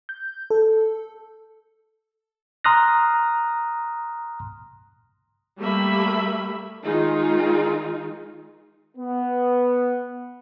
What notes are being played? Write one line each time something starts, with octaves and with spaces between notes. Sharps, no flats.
G6
A4
A#5 C6 D#6 F6 F#6 A#6
G3 A3 A#3 G4 E5 B5
D#3 G#3 D#4 F4
B3